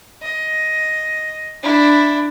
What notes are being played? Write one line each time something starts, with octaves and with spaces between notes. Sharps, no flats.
D#5
D4 E4